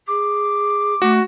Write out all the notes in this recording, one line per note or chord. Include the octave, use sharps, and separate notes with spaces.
G#4 D6
A3 F#4